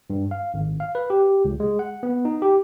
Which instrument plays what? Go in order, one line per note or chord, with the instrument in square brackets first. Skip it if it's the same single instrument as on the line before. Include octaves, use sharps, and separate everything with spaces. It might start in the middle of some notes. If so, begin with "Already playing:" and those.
[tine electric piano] G2
F5
G#1
F5
B4
G4
C#2
G#3
F#5
B3
D#4
G4